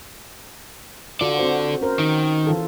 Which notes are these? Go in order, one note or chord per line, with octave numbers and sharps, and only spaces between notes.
F4 F#4 A4 D5
C4 F#4 C5
C#4 A#4 C5
D#3
E3 F4 A4